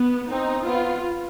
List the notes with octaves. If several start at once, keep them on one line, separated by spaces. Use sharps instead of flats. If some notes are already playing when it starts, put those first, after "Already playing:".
Already playing: B3
C4 D#4
B3 F4